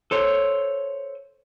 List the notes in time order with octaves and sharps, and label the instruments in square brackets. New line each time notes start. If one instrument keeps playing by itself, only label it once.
[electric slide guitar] A4 C5 C#5